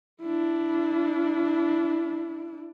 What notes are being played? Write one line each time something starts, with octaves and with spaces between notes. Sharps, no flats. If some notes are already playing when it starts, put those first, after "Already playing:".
D4 E4